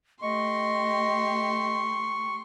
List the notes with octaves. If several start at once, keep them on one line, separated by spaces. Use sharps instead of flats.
A3 G4 D#5 C6 C#6